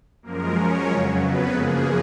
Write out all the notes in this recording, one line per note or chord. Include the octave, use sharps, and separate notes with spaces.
F#2 F3 G#3 A#3 A#4
C#4 C#5
F2 C#3 F#3 C#4 C#5
B3 B4
F#2 C#3 F3 G#3 A#3 G#4